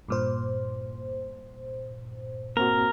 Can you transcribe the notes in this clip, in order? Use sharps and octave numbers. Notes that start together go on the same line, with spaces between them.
G2 A#2 C5
A#3 C4 F#4 A#4